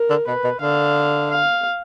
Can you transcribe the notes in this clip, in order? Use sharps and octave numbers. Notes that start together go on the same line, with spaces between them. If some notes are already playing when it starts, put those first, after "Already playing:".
Already playing: A#4
D3
B2 B4
B2
D3 F5
F5